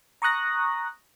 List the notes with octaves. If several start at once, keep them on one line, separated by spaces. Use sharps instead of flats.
A#5 C#6 D#6 F#6 A#6